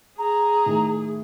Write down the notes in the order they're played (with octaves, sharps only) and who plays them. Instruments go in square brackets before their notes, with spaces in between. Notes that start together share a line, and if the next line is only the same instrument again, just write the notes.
[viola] G#4 [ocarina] A#5
[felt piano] A2 D#3